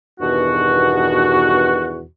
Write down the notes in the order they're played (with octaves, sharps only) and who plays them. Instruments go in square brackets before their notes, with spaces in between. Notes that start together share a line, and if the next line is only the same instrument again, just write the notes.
[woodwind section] E2 G2 B2 D#3 F#4